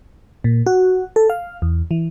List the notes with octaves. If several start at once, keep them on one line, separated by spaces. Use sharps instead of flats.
A#2
F#4
A4
F5
E2
E3